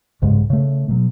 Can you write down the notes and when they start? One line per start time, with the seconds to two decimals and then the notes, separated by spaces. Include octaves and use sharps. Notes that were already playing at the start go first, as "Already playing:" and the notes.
0.22 C2 G#2 C#3 G#3
0.50 C#3 A3
0.89 B2 F#3